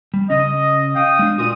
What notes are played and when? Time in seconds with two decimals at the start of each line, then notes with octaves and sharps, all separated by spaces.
0.14 G3
0.30 C#3 C#4 D#5
0.96 F5 G5 D#6
1.19 G#3 D4
1.38 A#2 F#4 A#4 D5 D#6